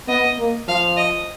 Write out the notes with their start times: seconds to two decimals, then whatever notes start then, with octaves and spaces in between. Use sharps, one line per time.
0.08 B3 D#5
0.39 A#3
0.68 F3 F5
0.97 D#5